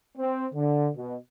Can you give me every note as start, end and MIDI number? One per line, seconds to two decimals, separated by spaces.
0.17 0.46 60
0.53 0.87 50
0.96 1.16 47